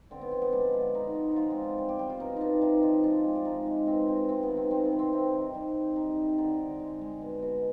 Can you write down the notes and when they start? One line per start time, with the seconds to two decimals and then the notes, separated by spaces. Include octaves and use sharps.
0.11 D3 C4
0.21 B3
0.31 F3 C4
0.42 B3
0.52 G#3 D4
0.73 D3
0.95 D3 D#4
1.16 F3
1.31 G#3 D#4 F4
1.51 C4
1.57 D3
1.64 D4
1.78 G3
1.89 G4
1.99 G3 G4
2.09 F4
2.20 B2 D#4
2.37 B2 D4 D#4
2.62 C3 D#4
2.83 F3 F4
3.04 G#3 D4
3.25 C3
3.35 D4
3.45 G#3 D#4
3.66 G#3
3.87 B2 C4
4.08 B2 C4
4.29 C3 C4
4.43 B3
4.50 D#3
4.57 C4
4.71 G3 C4
4.85 B3
4.92 C3
4.99 C4
5.12 C3 C4
5.33 D#3
5.54 G3
5.75 C3
5.96 G3 D#4
6.17 G3
6.38 D3 D#4
6.59 D3
6.80 G#3
7.01 G#3
7.22 B2
7.42 B2